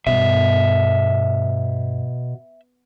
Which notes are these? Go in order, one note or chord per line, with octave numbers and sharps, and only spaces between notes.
G2 B2 E5